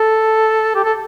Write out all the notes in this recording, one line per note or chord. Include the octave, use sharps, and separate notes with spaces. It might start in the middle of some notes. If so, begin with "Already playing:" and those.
Already playing: A4
G4
A4